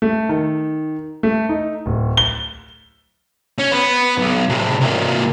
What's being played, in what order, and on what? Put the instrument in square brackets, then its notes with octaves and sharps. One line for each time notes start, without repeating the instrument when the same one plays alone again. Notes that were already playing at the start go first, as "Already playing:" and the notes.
[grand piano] A3
D#3
A3
D#4
D1
G7
[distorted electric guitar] C#4
B3
B1
A2 C3
C3 A#3